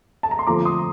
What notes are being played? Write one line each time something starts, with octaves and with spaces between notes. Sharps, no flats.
A5
A#5
C6
F2 D3 F3 A3 A#5 D6
C6 D#6